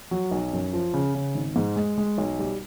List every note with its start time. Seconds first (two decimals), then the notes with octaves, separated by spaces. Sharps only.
0.11 F#3
0.31 B1
0.53 F#2
0.73 F3
0.94 C#3
1.15 C#3
1.35 G#1
1.56 G#2
1.76 G#3
1.98 G#3
2.18 B1
2.39 G3